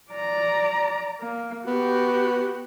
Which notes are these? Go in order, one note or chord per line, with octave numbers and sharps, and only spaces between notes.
D5 A#5
A#3
B3 F#4 G4